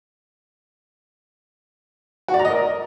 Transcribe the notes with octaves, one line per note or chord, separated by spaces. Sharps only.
F#4
D5
A#5
D#5
A#4